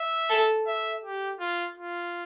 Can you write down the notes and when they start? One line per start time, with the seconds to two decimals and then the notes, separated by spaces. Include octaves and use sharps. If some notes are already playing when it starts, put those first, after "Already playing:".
Already playing: E5
0.30 A4
0.67 E5
1.04 G4
1.40 F4
1.77 F4